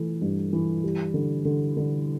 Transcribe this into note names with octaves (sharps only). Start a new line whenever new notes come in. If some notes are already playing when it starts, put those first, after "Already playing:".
Already playing: E3 A3
G2
E3
G3
D3
D3
D3